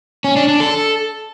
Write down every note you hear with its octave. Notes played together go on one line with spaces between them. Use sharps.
C#4
D4
D4
A4